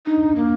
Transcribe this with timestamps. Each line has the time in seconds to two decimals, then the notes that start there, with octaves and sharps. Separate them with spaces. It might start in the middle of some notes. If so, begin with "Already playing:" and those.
0.06 D4 D#4
0.26 D4
0.36 A#3